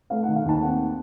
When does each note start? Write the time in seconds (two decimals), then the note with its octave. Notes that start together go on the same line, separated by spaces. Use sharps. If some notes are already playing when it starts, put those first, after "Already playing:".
0.10 A3 F5
0.23 F#5
0.28 D#3
0.36 F5
0.45 D#2 A5
0.62 C4 F#5